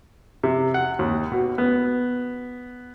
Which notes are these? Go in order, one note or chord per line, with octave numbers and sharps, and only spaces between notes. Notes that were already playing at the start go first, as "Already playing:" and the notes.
C3
F#5
D#2
B2
B3